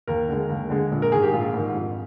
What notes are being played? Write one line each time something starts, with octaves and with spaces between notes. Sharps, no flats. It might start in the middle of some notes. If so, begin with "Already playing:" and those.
D#2 A#4
D3 G#3
D#2
D3 G#3
A#1
A#4
G#2 D#3 G#4
G4
A#1 F4
G#2 D#3
F2